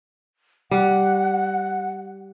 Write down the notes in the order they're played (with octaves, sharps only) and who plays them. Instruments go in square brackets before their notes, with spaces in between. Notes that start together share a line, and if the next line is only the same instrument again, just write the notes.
[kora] G3 [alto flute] F#5